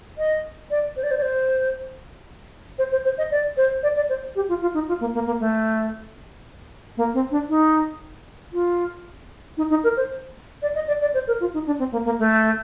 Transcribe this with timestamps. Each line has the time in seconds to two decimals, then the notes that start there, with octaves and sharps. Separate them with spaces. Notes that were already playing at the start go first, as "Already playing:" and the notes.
0.18 D#5
0.70 D5
0.96 C5
1.03 D5
1.11 C5
1.17 D5
1.22 C5
2.79 C5
2.92 C5
3.05 C5
3.18 D#5
3.31 D5
3.57 C5
3.83 D5
3.96 D5
4.09 C5
4.36 G4
4.49 F4
4.62 F4
4.74 D#4
4.88 F4
5.00 A#3
5.14 A#3
5.26 A#3
5.40 A3
6.97 A#3
7.14 C4
7.31 D4
7.49 D#4
8.53 F4
9.57 D#4
9.70 D#4
9.84 A#4
9.97 C5
10.62 D5
10.75 D#5
10.87 D5
11.01 D5
11.14 C5
11.28 A#4
11.40 F4
11.54 D#4
11.66 D4
11.79 C4
11.92 A#3
12.05 A#3
12.19 A3